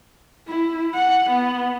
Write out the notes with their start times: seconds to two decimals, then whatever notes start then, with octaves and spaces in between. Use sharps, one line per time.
0.48 E4
0.95 F#5
1.30 B3